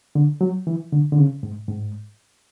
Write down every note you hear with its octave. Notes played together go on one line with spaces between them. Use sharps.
D3
F#3
E3
D3
D3
C#3
G#2
G#2